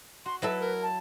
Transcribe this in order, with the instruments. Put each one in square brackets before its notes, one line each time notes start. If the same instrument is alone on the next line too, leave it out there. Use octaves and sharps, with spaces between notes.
[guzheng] F#4 [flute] C6
[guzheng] F#3 E4 A4 [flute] B4
[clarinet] A#4
[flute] A5